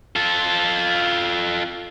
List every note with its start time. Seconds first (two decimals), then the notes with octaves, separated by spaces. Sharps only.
0.16 F4 A4